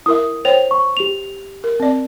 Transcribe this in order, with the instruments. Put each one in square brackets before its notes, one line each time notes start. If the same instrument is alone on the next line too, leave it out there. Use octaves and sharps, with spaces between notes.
[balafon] E4 A#4 E5 [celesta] D#6
[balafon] C5 C#5 G5 [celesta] F7
[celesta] C#6
G4 F7
[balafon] A#4
C4 D5